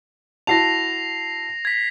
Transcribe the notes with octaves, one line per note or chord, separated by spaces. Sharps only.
E4 F#4 A5 A#6 C7 F7
G#6 B6